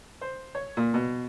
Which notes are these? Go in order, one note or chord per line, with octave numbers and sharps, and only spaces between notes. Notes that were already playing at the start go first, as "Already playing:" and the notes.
C5
C#5
A#2
B2